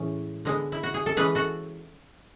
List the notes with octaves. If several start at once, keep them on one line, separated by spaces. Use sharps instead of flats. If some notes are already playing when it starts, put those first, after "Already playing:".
Already playing: A2 E3 G#3 C#4
D3 G#3 B3
E4
F#4
G#4
A4
E3 G#3 C#4 G#4 B4
F#4 A4